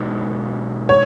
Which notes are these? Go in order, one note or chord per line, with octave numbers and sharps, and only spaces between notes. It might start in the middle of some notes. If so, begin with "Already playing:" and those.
Already playing: B2 G#3 B3 D#4 F#4
C#5